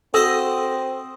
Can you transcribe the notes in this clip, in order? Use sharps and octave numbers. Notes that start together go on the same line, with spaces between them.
C4 F#4 A4 C5 D#5 D#6 E6 A#6